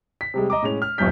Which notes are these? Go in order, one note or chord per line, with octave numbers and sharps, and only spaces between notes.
B6
C3 G3 G#3
D#5 A#5 D6
A2 G#3 C#4 F7
F6
D#1 B1 F#2 F#3 G6 B6